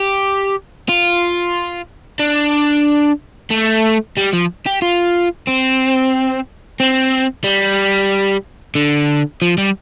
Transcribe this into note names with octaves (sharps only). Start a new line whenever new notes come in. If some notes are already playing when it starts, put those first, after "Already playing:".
Already playing: G4
F4
D4
A3
G3
F3
G4
F4
C4
C4
G3
D3
F3
G3